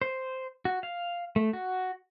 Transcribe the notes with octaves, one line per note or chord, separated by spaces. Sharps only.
C5
F#4
F5
A3
F#4